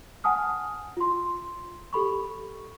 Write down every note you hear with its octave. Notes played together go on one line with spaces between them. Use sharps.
F#5 G#5 A5 D#6 F6
F4 C6
G4 A4 B5 C#6